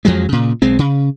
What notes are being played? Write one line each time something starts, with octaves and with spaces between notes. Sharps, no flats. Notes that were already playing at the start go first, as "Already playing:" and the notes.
F2 F3 F#3 G#3
A#2 C#3
B1 G#3 C4
C#3